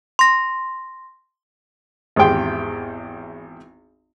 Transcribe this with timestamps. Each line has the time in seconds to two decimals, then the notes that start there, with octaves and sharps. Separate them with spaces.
0.19 C6 A#6
2.16 G#1 E2 C4 G4 G5 C6